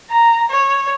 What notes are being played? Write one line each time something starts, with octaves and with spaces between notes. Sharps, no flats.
A#5
C#5